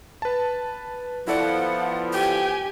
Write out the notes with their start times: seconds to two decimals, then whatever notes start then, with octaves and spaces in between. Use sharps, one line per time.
0.22 B4 A5
1.27 F3 B3 E4 A4 D5 F#5
2.13 G4 G5 G#5